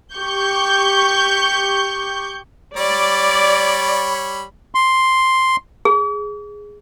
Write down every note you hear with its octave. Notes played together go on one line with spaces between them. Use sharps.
G4 C#6 G6
G3 C#5 D5 B5
C6
G#4